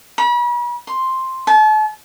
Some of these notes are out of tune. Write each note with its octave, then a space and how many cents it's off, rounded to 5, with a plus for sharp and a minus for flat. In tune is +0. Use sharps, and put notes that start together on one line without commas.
B5 -40
C6 +5
A5 -40